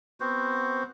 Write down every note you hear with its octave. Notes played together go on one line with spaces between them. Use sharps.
B3 C4 F#4 C5